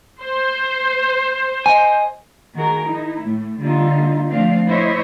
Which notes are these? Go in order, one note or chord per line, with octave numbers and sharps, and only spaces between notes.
C5
D#5 G#5
D#3 F#4 G#4 A#4
D#4 E4
A2 A3
D3 G3 A#3 D#4 F4
F3 A3 C4 D4 F5
E4 C5 C#5 D#5 E5